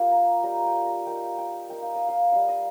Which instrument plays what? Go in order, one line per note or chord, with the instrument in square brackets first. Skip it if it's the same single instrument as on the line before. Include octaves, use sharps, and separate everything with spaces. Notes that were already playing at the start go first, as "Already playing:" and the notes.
Already playing: [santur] A#3 D#4 F4 G4 D#5 F5
A#5
G3 D#4 A#5
G5
A#5
A#3 D#4 G5
G5
A#3 D#4 G5
F5
D#5
F5
G3 D#4 F5
D#5